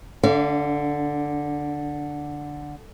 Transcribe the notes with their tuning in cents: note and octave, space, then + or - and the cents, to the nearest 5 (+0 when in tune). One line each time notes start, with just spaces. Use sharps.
D3 +0 D4 -40 F5 -45